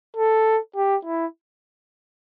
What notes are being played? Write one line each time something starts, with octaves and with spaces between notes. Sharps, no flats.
A4
G4
E4